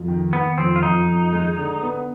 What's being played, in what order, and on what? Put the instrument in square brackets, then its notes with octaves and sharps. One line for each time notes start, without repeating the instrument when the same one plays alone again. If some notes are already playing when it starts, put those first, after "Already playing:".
Already playing: [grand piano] F2
D#3
[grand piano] D#3 [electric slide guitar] B3
[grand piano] F2 [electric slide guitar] C4
[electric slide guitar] F4
[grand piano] F2 [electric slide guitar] D#4
[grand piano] F2
G#3
D3
B3